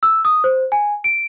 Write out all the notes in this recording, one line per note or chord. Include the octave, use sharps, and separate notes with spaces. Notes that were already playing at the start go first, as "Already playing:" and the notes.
E6
D#6
C5
G#5
D7